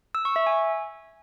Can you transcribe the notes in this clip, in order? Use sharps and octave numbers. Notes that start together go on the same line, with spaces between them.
E6
C#6
E5
G#5